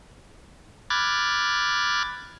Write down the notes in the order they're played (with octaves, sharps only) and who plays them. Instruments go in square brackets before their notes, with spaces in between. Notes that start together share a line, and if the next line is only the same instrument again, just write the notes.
[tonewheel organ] B5 D6 F6 F#6 G#6 A6